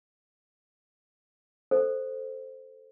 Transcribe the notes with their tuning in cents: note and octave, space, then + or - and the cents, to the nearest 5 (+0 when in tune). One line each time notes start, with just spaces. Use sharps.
A4 +0 C5 +0 D#5 +0